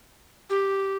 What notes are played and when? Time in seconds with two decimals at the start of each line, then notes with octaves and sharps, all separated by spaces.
0.50 G4